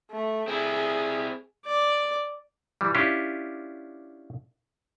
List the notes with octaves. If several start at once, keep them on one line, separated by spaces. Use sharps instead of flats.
A3
C4 E4 G#4
D5
E3 G3
C#4 D4 E4 F4 G4